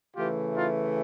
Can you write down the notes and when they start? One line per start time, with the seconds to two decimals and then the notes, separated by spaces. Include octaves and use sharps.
0.15 C#3 E3 A3 F4 G4
0.54 D#4 F4